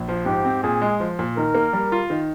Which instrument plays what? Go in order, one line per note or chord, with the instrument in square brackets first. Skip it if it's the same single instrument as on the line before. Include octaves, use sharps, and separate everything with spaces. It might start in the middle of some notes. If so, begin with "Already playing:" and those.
Already playing: [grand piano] A#1
F3
[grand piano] G#2 [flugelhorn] G4
[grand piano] C4
[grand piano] A#2 [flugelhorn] G#4
[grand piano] G#3
F3
A#2
[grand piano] D#3 [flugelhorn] A#4
[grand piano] A#3
G3
F4
D#3